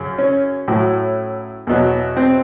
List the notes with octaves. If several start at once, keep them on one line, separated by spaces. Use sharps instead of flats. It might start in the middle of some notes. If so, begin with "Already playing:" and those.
Already playing: F#2 C#3
C#4
A2 F#3
E2 B2 F#3
C4